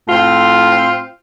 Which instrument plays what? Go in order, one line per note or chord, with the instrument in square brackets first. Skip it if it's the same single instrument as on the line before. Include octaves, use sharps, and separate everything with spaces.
[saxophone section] A2 C4 F4